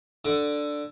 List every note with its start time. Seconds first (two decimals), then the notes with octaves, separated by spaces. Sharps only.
0.25 D3